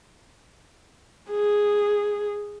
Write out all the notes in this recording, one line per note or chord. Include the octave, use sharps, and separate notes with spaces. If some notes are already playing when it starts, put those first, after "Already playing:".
G#4